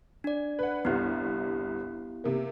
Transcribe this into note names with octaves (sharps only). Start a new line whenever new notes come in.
D4 D5
B4 F#5
G1 C2 B3 E4 G4
C3 A#3